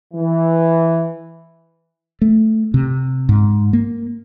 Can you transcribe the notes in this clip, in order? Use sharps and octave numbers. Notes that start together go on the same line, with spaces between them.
E3
A3
C3
G#2
A#3